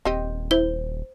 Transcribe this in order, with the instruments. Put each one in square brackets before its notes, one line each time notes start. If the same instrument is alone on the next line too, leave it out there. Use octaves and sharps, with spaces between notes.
[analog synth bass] D#1 [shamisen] C4 G4 D#5
[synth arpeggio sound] E4 [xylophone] C5 G7